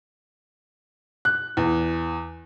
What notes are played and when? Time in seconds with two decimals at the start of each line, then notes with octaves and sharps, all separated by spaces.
1.25 F#6
1.57 E2